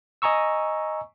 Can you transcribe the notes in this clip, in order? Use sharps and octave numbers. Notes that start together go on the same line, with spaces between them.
D#5 G#5 A#5 C#6 E6